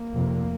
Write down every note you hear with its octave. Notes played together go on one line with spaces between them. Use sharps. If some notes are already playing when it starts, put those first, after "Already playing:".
Already playing: A#3
F1 F2 C3